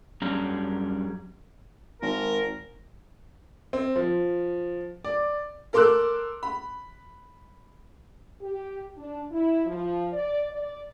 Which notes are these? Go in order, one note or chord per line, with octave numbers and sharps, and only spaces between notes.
F#2 G3 C#4 D4 G#4 A#5
G#1 A#4
C4
F3
D5
A4 A#4 C6 D6 E6 F#6
B5
G4
D4
E4
F3
D5
D5